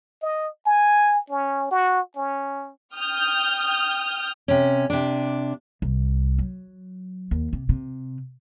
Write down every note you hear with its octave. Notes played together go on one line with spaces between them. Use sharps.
D#5
G#5
C#4
F#4
C#4
G5 D#6 F6 G6
C3 C#4
C3 D4
C2
F#3
D#2
C3
C3